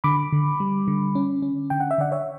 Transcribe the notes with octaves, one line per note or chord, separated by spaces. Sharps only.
D3 B5 D6
D3
G3
D3
C#4
C#4
D3 G5
F#5
E5
D3 D5 F#5
C#5 E5